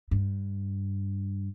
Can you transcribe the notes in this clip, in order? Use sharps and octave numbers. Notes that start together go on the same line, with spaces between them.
G2